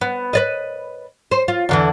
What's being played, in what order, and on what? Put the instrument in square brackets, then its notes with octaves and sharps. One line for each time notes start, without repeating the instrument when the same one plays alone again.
[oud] B3
B4 D5 D#5
C5
F4
E2 D3 E3